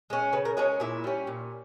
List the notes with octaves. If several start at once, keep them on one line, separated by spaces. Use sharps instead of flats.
G#3 C#4
C#3 B4
A#4
G#3 C#4 G#4
A#2 E4
G3 C#4
A#2